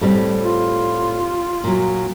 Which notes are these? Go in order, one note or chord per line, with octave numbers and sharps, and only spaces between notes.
A2 G3 C4
F4
A#2 F#3